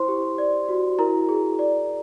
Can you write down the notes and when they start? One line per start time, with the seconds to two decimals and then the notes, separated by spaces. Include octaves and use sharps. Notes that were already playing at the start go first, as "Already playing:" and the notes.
Already playing: E4 C5 C6
0.08 G4
0.38 D5
0.69 F#4
0.99 E4 A#4 A#5
1.29 G#4
1.59 D5